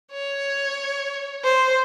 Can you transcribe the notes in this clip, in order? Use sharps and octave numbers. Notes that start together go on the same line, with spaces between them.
C#5
C5